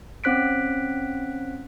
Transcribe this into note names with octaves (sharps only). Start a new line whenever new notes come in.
C4 C#4 C5 F#6 B6 D7